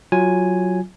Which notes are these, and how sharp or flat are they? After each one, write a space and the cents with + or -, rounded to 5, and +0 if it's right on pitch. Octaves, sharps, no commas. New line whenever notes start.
F#3 +0 F4 +0 G#5 +0